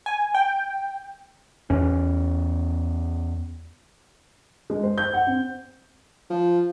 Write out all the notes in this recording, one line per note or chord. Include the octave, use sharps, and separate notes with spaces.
G#5
G5
E2 C#4
G#3
C5
G6
F#5
C4
F3